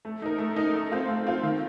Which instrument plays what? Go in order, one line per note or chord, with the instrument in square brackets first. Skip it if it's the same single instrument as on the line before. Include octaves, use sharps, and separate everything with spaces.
[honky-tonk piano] A3
D#4 A#4
A3
D#4 A#4
A3
C4 F4
A3
C4 F4
D#3